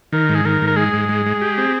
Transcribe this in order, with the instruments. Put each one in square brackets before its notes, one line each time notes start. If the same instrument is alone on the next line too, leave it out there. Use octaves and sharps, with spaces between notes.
[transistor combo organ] D#3 [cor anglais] A#4
[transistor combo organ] G#2
[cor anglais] G#4
[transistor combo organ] D#3 [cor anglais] A#4
[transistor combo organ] G#2
[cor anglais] A#4
[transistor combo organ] G#3 [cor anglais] G#4
[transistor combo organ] G#2
G#3
G#3
G4
C4